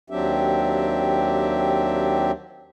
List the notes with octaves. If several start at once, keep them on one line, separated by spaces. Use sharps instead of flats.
D#2 F#3 C4 D4 G4 E5